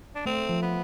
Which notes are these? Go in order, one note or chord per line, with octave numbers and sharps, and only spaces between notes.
D4
A3 C4
F3
B3